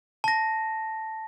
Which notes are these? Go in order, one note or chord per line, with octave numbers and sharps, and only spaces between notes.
A5 A#6